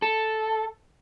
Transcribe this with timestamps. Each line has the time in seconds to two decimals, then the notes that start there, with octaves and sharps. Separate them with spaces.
0.02 A4